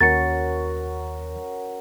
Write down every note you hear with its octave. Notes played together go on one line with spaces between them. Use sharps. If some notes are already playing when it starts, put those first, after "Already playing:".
D#2 C#4 F#4 A#4 A6 C#7